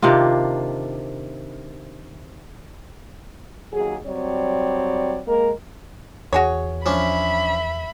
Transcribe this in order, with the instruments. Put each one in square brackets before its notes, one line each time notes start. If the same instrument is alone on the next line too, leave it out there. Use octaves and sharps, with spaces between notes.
[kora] C3 D#3 D4 F4
[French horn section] D#2 F#3 G#4
F#3 G3 C4 C#5 D5
G#3 A#3 A#4
[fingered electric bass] E2 [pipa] F#4 G#4 C#5
[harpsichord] F3 C#4 D4 [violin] E5 B5